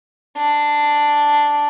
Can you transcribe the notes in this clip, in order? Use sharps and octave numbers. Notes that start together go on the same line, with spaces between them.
D4